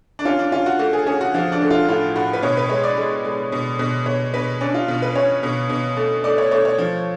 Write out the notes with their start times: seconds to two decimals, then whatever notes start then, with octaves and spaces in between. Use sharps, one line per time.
0.19 D4
0.25 C#4 F4
0.39 D4
0.52 C#4 F4
0.66 F#4
0.79 A3 F#4
0.93 G#4
1.06 C#4 G#4
1.21 F#4
1.34 F3 F4
1.52 D4
1.61 A3
1.71 F4
1.88 A2 F4
2.16 A2 F#4
2.33 B4
2.43 B2 C#5
2.57 B4
2.70 G#3 C#5
2.83 D5
2.97 G#3
3.25 G#3
3.52 B2
3.79 B2
4.06 B2 C#5
4.34 B2 B4
4.61 C#4 D4
4.74 F4
4.88 B2
5.02 B4
5.15 C#4 C#5
5.43 B2
5.70 B2
5.97 A3
6.24 A3 D5
6.38 C#5
6.51 A3 C#5
6.65 C#5
6.78 F3